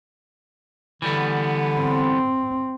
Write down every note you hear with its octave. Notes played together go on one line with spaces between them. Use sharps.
D3 E3 G3 B3
C4